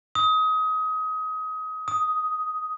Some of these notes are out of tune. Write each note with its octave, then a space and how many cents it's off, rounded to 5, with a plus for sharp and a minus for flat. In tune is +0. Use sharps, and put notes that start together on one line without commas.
D#6 +25
D#6 +5